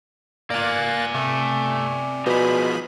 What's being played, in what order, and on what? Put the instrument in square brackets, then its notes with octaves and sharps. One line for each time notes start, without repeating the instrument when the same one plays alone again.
[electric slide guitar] A#3 [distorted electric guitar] D5 G#5 [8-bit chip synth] F#6 A6
[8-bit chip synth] C3 [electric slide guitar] A3
[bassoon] B2 [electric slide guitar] F3 B3 D#4 [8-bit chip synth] G#4 B5